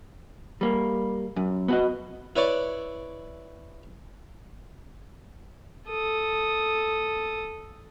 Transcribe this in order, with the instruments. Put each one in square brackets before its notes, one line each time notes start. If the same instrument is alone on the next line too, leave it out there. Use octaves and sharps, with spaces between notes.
[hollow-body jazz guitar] G3 A#3
F#2
B3 F#4 D#5
[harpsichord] E4 B4 C#5 D5 D6
[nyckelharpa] A4 D#6